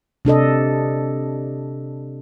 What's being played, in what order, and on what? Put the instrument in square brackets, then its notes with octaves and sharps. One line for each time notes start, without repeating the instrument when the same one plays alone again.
[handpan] C3 D4 A4 D#5